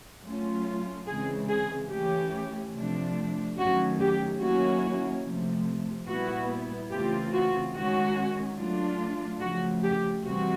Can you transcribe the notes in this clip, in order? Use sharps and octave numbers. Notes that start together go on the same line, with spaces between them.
F#3 A3 C#4 F4
C#3 E3 G#3 C4 G#4
G#4
E3 A3 C#4 G4
C3 F3 A3 D4
D#3 F#3 A3 C#4 F#4
G4
D#3 F#3 A#3 C#4 E4 F#4
C3 F3 A3
A#2 G3 B3 E4 F#4
C#3 E3 A3 C4 F4 G4
F#4
D#3 G#3 C#4 F#4
F#3 A3 D4 F4
C#3 F3 A3 F#4
G4
C3 E3 G3 C4 F#4